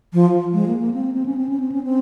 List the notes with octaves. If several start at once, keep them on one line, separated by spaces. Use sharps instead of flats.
F3
G#3
A#3
A#3
C4
C4
C#4
C4
C#4
C4
C#4
C4